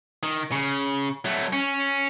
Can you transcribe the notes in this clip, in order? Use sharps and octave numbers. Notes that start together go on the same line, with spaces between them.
D#3
C#3
F#3 A3
C#4